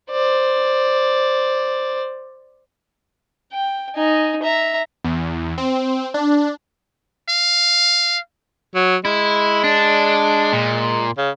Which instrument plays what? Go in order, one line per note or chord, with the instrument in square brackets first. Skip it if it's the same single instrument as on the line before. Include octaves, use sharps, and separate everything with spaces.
[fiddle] C5 D5
[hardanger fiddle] G5
D#4 G#5
E5 A#5
[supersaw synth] E2
C4
D4
[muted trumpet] F5
[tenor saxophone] F#3
[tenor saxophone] G#3 [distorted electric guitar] E4
[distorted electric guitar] D4
A#2
[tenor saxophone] C#3